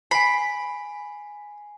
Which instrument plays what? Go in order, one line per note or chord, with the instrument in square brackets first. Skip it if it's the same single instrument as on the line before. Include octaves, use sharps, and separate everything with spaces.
[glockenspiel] G#5 C7 [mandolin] B5